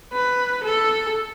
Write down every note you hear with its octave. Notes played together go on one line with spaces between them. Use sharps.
B4
A4